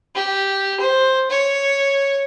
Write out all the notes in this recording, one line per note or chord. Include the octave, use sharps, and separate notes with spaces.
G4
C5
C#5